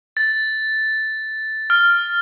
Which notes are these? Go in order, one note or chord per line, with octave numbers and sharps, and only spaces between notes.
A6
F6